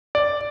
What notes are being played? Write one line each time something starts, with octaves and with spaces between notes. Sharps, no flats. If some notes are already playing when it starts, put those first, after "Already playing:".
D5